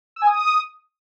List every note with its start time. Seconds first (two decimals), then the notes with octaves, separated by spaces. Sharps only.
0.16 E6
0.22 G#5
0.27 D#6